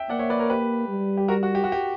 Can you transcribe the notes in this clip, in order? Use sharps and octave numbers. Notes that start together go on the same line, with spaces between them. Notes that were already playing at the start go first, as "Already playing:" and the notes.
Already playing: E5 G5
A#3 D5 F#5
C#5 E5
B4 D5
A#4 C#5
G4 B4
G3
G4
F#4 A#4
F#4
G4
F#4
G4